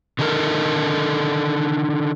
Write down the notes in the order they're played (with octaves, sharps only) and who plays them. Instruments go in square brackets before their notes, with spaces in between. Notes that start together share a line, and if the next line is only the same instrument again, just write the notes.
[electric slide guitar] D3 D#3 D#4 A4 A#4